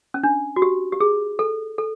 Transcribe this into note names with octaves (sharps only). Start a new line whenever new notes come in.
C#4
D4
F#4
G4
G4
G#4
A4
A4